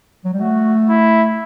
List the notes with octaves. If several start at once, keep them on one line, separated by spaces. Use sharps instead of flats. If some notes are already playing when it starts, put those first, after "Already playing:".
F#3
G3
A3 F#4
E4